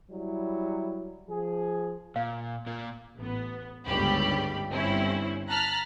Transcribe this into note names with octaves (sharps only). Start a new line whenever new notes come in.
F#3 G3 E4
F3 G#4
A#2 F5
A#2 A#3
A1 B3
G1 C#2 G#2 G3 G4 B5
G1 G2 C4 C#4 E4
A5 A#5 F6 F#6 A6 B6